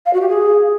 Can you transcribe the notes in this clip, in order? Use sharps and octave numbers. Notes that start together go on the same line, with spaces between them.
F5
F#4
G4
G#4